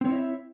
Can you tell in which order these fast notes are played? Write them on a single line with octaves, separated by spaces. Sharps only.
C4 C#5 E4 D#5 E5